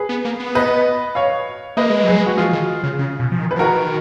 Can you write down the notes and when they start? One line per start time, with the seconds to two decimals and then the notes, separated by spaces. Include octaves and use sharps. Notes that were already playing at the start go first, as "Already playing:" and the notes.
Already playing: G#4 B4
0.09 B3
0.25 A#3
0.40 B3
0.55 B4 D#5
1.15 C#5 F5
1.77 A#3 B4 D#5
1.90 G#3
2.04 F#3 G#4 B4
2.16 G#3
2.26 F#4
2.37 F3 F4 G#4
2.53 D#3
2.83 C#3
2.99 C#3
3.20 B2
3.31 F3
3.39 D#3
3.51 B4
3.56 F3
3.59 D#3 F#4 A#4